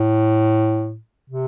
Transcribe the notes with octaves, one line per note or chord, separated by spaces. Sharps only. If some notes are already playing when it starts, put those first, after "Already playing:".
Already playing: A2
C3